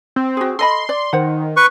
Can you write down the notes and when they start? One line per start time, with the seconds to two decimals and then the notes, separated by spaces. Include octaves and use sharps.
0.16 C4
0.37 F#4 G#4
0.59 A4 D#5 B5 C6
0.89 D5
1.13 D#3 C5 F#5
1.57 B4 C#6